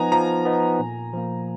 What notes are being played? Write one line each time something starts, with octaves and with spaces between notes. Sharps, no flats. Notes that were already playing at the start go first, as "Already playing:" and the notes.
Already playing: F3 B3 D#4 G#5 A#5
F3 A#5
B3 D#4
A#2
F3 A#3